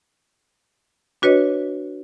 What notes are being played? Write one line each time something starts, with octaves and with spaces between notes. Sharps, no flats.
D4 F#4 B4 C#5 D#5